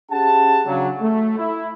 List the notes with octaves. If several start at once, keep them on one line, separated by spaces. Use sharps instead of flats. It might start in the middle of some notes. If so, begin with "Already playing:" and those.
C#4 G4 G#4 F#5 A5
C#3 F#3 D4
A3
E4